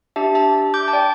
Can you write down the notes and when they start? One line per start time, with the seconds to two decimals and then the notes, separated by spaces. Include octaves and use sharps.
0.16 D4 G4 E5 A5
0.35 E5 A5
0.74 D6 G6
0.88 A5
0.93 D5 G5